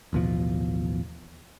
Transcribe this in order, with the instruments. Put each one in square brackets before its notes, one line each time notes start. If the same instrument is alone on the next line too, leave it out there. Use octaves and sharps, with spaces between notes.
[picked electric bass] A1 D#2 B2 F3